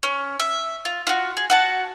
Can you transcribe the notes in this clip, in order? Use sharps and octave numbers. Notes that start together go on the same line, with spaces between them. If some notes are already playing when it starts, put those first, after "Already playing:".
C#4
E5
F4
F4 F#4
G#4
F#4 F#5 A5